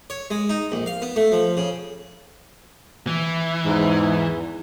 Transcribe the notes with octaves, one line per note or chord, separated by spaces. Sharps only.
C#5
G#3
D#4
A#1
F5
B3
A3
F3
C#3
E3
E2 G#2